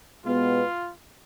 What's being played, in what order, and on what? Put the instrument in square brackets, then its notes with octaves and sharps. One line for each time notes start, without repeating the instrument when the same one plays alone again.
[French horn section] B2 G#3 B3 [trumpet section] F4